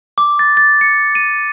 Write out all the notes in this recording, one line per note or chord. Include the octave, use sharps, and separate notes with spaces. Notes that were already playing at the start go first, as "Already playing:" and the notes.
D6
A6
A6
C#7
D#7